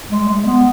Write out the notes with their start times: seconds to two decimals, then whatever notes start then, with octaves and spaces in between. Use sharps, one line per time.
0.10 G#3
0.28 G#3
0.46 B3